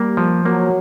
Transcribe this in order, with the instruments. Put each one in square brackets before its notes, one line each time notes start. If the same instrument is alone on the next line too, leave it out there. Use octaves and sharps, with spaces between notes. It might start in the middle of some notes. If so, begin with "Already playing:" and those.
Already playing: [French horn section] G3 [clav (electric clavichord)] A#3
[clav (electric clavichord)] F3
[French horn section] F#3 [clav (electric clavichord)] A#3